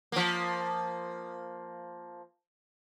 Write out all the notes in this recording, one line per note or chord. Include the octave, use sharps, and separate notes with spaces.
F3 A#3